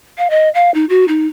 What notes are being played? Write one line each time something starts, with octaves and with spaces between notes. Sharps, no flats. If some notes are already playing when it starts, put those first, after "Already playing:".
F5
D#5
F5
D#4
F#4
D#4